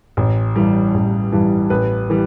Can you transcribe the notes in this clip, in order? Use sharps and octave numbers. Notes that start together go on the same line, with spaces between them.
A1
G2 E3 G3
A1
G2 E3 G3
A1 B4
E3 G3